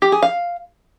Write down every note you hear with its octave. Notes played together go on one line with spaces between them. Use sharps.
G4
G#4
F5